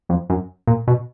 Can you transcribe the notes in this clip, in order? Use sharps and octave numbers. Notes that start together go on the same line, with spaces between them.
F2
F#2
A#2
B2